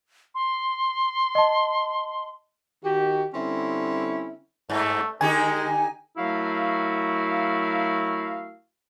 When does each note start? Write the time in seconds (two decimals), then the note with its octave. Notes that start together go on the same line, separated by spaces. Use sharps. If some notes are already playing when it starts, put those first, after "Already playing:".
0.35 C6
1.35 D#5 A5
2.84 D#3 F#4 G4
3.34 D3 G3 C4 C#4 E4
4.70 G2 A3
5.21 D3 G#3 D#4 G4 G#5
6.17 F#3 A3 E4 F#4 A#4 F5